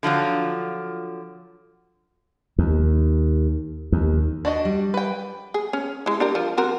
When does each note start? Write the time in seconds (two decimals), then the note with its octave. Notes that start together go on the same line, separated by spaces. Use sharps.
0.03 D3 F3 F#3 F4
2.58 D#2
3.92 D#2
4.45 D4 F#4 D#5
4.65 G3
4.94 B4 G5
5.54 G#4
5.73 C#4
6.06 G#3 E4
6.20 D4 G4 A#4
6.35 F3
6.58 C4 F#4 A#4